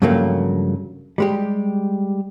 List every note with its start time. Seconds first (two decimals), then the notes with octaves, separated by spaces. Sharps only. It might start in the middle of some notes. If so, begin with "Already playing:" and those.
0.02 G2 C#3 F3 F#3 A3 A#3
1.18 G3 G#3 G4